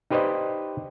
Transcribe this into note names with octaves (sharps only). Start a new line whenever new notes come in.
D#4 G4 B4 C5 D5 D#5